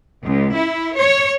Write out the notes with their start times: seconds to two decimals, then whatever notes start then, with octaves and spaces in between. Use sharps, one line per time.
0.24 C#2
0.54 E4
0.96 C#5